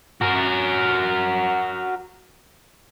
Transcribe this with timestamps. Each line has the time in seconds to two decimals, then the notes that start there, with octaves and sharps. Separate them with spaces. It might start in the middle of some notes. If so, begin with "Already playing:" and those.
0.21 F#4 A#4